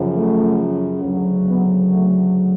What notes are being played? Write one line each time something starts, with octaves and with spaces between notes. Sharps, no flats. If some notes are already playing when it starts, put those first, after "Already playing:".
Already playing: F#2 C#3 F3
A3
D2 C#3 F#3
B3
A3